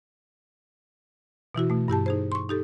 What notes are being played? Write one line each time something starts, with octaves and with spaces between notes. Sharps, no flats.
B2 E3 E4 F#4
B2 A3
G2 E4 G4 A5
D#4 G#4 C5
C6 C#6
D#4 G4 A4